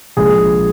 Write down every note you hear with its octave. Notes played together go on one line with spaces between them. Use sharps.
A#1 A#2 G#3 G#4